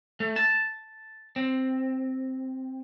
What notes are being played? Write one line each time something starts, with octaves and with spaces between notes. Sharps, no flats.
A3
A5
C4